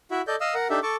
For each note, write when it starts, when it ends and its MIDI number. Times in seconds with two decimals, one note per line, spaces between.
0.11 0.22 64
0.11 0.22 66
0.11 0.22 76
0.27 0.36 69
0.27 0.36 74
0.27 0.36 75
0.27 0.36 91
0.41 0.54 75
0.41 0.54 77
0.41 0.54 87
0.41 0.54 88
0.54 0.68 70
0.54 0.68 78
0.54 0.68 82
0.70 0.80 62
0.70 0.80 63
0.70 0.80 67
0.70 0.80 69
0.70 0.80 76
0.83 0.96 69
0.83 0.96 81
0.83 0.96 85
0.83 0.96 86